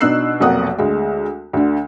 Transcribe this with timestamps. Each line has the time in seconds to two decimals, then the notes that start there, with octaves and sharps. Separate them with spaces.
0.01 B2 D4 D#4 E6 F#6 C7
0.40 F1 B1 F2 A#3 F#5 D#6
0.78 D2 G#3
1.53 D2 D3